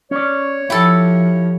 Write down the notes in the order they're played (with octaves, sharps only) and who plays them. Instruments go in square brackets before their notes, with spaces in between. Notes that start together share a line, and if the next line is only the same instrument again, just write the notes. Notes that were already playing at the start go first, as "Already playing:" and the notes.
[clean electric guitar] C#4 D5 [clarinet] C#5
[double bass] F3 [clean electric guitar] E4 [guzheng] G4 A4